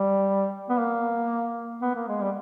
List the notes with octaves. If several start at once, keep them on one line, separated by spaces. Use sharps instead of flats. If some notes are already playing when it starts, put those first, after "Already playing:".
Already playing: G3
B3
A#3
B3
A#3
G#3
G3